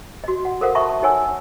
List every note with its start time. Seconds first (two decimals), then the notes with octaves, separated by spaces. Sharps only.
0.24 F#4 D#5
0.45 F#5
0.61 A4 A#4 C5 F5 F#5
0.75 D#5 E5 A5 B5 C#6 D#6
0.89 A5
1.02 D#4 A4 C#5 F#5 G#5 E6